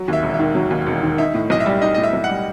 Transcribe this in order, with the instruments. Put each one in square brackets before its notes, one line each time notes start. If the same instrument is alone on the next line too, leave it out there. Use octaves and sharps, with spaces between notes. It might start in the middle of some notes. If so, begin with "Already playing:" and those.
Already playing: [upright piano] F#3
[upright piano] D#2 [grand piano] E5
[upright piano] E1
[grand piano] E5
[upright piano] D#3
F#3
D#2
E1
D#3
[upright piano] D#4 [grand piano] E5
[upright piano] A2
[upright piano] B1 [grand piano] D#5
[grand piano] E5
[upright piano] G3
[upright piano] D#4 [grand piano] D#5
[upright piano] A2 [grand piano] D#5
[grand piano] E5
[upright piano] B1
[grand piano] F#5
[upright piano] G3